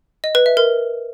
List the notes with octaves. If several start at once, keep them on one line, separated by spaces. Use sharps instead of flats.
D#5
B4
E5
A#4